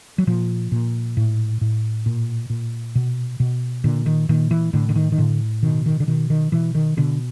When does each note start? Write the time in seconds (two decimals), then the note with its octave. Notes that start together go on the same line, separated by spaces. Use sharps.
0.18 F#3
0.27 A#2 F3
0.72 A#2
1.17 A2
1.61 A2
2.06 A#2
2.50 A#2
2.95 B2
3.40 B2
3.84 A#2 D3
4.06 D#3
4.29 A#2 D#3
4.51 E3
4.73 A2 D3
4.89 D3
4.96 D#3
5.12 D#3
5.18 A2 D3
5.63 B2 D#3
5.86 D#3
6.00 D3
6.08 B2 D#3
6.30 D#3
6.52 B2 E3
6.75 D#3
6.97 B2 D3